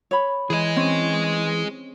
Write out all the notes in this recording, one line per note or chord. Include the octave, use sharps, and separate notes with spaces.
C#5 B5
E3 G#4 D#5
C4 C#4